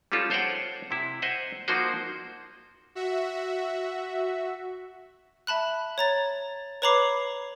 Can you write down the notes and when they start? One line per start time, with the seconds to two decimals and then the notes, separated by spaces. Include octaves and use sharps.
0.12 G3 G#3 C#4 D#4 F4 A4
0.30 A4 C5 C#5 D#5 F#5 G5
0.91 C3 E4
1.22 C5 D#5 E5 F#5
1.68 F3 A#3 D#4 F#4 C5
2.95 F#4 E5
5.47 E5 A5 B5 F#6
5.98 C#5 A#5 A6
6.82 B4 C#5 A#5 B5 D6 C7